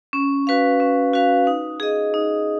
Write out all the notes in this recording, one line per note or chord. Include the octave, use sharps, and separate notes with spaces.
C#4
F#4 B4 F5
C#4
F#4 B4 F5
D#4
G#4 D#5
D#4